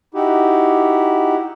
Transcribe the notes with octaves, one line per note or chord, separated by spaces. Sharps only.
D#4 E4 F#4 G4